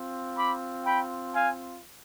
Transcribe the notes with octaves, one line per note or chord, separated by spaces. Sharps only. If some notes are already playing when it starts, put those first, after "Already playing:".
Already playing: C4 F4
B5 D6
G5 B5
F5 G#5